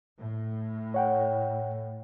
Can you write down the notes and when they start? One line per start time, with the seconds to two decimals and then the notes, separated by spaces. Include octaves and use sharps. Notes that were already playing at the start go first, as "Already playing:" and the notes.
0.18 A2
0.94 C#5 F#5 G5